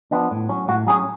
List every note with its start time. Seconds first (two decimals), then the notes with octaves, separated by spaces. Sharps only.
0.11 F3 B3 D4
0.31 A2
0.49 F#3 C#4
0.68 A2 F#4
0.87 F#3 C#4 G#4